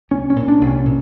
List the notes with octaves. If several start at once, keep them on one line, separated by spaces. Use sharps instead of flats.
C2 C#4
C#4
A#2
D4
C2
C#4
A#2